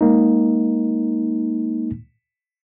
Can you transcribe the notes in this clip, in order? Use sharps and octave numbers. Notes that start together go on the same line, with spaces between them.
G#3 A#3 D#4